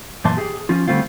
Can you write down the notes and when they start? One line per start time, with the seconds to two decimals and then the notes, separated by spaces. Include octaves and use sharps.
0.24 F#2 A#2 E3 E5 A5 C6
0.37 G4 G#4
0.69 F3 C#4 F4
0.88 D3 G3 A3 C4 F4